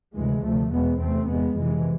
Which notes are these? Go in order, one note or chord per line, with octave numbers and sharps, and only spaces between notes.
D2 C3 E3 G#3
D2 C3 F3 A3
E2 B2 G#3 B3
E2 C3 A3 C4
E2 C3 G#3 B3
F2 C3 E3 G#3